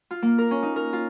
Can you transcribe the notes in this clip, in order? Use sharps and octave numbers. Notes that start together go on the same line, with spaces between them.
F4
A#3
A#4
C#4
D#4
A#4
F4